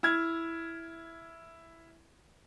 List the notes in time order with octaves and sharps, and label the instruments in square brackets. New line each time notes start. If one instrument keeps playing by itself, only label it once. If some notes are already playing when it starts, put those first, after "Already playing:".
[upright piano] E4 F6 G#6